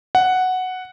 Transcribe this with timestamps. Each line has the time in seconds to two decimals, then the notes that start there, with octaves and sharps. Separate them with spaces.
0.15 F#5